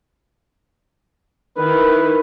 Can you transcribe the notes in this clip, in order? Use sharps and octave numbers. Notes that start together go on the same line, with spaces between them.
D#3 E4 B4